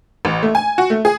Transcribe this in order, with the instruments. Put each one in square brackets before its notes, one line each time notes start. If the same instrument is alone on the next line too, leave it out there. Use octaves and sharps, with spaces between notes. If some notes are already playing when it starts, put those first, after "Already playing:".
[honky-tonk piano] A1
A3
G#5
F#4
A3
G#4